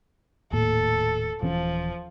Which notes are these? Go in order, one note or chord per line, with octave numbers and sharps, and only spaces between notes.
D#1 A2 A#3 A4
D#1 E3 F3 C#4